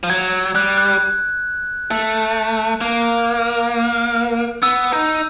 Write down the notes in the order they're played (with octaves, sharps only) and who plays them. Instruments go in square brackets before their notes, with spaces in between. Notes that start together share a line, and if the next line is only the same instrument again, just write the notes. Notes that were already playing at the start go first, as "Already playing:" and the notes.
[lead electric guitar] F3
[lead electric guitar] F#3 [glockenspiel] G#6
[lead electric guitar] G3 [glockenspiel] F#6
[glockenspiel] F#6
[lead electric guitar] A3
A#3
[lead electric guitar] B3 [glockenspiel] E6
[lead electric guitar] D#4